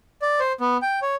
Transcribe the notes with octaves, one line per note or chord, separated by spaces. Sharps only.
D5
C5
B3
G5
C#5